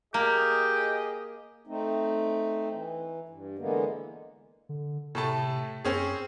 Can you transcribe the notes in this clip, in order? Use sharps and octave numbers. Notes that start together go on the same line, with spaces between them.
A#3 G4 G#4 D#5
A3 C4 D#4
E3
G2
D3 E3 G#3 A#3 B3
D3
A2 C3 A3 A5
F#2 C4 C#4 G#4